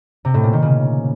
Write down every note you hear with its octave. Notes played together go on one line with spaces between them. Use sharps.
C3
A2
A#2
D#3
C#3